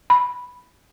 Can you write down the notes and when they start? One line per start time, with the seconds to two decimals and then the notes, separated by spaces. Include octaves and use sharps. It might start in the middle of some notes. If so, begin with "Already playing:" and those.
0.10 B5